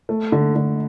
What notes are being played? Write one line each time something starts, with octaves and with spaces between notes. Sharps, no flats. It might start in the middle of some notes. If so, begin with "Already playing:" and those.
A3
D3
D3